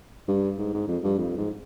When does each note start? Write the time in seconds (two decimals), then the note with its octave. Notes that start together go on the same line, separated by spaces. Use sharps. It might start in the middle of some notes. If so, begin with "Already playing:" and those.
0.28 G2
0.58 G#2
0.73 G#2
0.88 F2
1.03 G2
1.18 F2
1.37 G#2